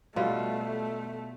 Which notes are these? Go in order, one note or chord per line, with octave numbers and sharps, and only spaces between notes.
B2 G3 A3 F4